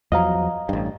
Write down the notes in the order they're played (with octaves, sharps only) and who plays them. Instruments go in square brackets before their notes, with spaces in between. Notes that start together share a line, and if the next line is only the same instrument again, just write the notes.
[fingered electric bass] E2 F3 F#3 [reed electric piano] D#5 F5 A#5
[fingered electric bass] A1 G2